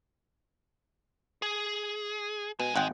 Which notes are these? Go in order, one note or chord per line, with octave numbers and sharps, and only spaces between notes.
G#4
B2 G#3 G#5
G#1 G#3 F#5 G5